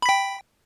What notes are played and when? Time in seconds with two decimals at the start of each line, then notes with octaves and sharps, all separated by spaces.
0.02 B5
0.06 B6
0.09 G5